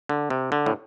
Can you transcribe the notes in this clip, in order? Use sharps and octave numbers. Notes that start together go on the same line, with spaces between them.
D3
C3
D3
A2